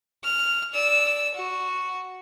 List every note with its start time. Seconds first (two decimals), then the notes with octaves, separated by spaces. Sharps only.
0.24 F6
0.73 D5 E6
1.34 F#4